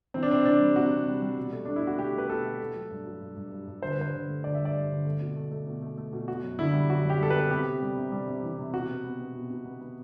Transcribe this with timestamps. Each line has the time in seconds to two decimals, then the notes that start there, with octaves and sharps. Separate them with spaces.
0.14 E3 C4
0.23 D4
0.30 C3 C4
0.45 E3 D4
0.60 G3
0.76 C3 F#4
0.91 C3
1.06 G3
1.22 G3
1.37 B2
1.52 A3
1.65 A3 D4
1.76 E4
1.83 B2 F#4
1.99 A3 G4
2.14 A3 B4
2.29 B2 A4
2.45 A3
2.60 A3
2.75 F#3
2.91 G2
3.06 F#3
3.22 G2
3.36 G2
3.52 G2
3.68 G2
3.82 D3 C5
3.92 B4
3.98 G2 C5
4.13 D3
4.28 A3
4.44 D3 D5
4.55 G2 E5
4.65 D5
4.75 G2
4.90 D3
5.05 A3
5.21 B2
5.36 A3
5.51 A3
5.67 B2
5.82 A3
5.98 A3
6.13 B2
6.28 B3 F#4
6.43 F#2
6.59 D3 E4
6.74 G3
6.89 F#2 F#4
7.05 F#2 G4
7.20 G3 A4
7.30 B4
7.35 B3
7.50 C3 G4
7.66 C3
7.81 G3
7.97 C3
8.12 G3
8.27 C3
8.43 E3
8.58 C3
8.73 B2 F#4
8.89 B3
9.04 B3
9.20 B3
9.35 B2
9.50 B2
9.65 B3
9.81 B3